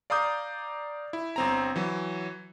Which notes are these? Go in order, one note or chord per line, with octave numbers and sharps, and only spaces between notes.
D5 F5 A#5 D6 D#6 G6
E4
G1 C4 A#5
E3 F#3